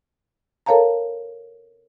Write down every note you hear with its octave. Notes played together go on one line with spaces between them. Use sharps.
A4 A#4 C#5 F5 A5 A#5